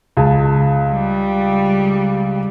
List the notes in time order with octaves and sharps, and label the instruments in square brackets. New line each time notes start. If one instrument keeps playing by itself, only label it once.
[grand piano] C#2 G#4 A5
[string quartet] G3